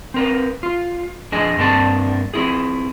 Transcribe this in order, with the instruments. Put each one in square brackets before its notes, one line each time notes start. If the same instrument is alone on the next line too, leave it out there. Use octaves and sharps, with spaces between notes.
[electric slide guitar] C4 A#4 B4
F4
F2 D4 G#4 D#5 G#5
G2 A#3 C4 D4 F#4 A5
C4 E4 G#4